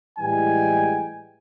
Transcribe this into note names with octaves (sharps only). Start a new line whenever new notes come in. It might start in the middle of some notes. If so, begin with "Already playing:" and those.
A2 E3 G3 G#3 G5 G#5